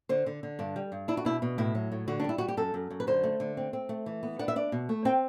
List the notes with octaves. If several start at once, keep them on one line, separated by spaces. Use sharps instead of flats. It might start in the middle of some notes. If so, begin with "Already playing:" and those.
D3 C5
D3
D3
G2 D4
G3
G2
D4 E4
F#4
B2 E4
B2
A2 E4
F#3
A2
D3 F#4
D4
G3 E4
G3 F#4
G4
F#2 A4
F#2
F#2
B4
D3 C5
A3
D3
C4
C4
A3
E3
B3
D4 F#5
E5
D4 D5
B2
A3
C4 G5